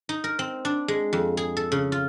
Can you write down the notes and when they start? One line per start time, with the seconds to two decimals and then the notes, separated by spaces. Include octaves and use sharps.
0.09 D#4
0.24 A#4
0.39 C4
0.65 D4
0.88 G#3
1.13 F2
1.37 G#4
1.57 A4
1.72 C#3
1.92 F4